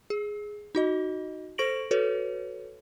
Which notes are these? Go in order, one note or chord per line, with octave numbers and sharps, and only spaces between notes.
G#4
D#4 F#4 D#5
A4 C5 C#6 A#6 D7 F#7
F#4 A4 B4 C#5